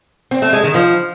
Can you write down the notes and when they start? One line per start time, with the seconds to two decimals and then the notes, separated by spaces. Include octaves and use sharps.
0.31 C4
0.42 A3
0.53 G#3
0.64 D#3
0.74 F3